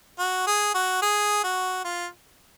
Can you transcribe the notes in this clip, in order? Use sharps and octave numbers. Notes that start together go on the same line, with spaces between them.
F#4
G#4
F#4
G#4
F#4
F4